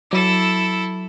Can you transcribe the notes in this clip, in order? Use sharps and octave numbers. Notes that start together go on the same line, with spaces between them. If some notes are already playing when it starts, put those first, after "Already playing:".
F#3 E4 A4 D6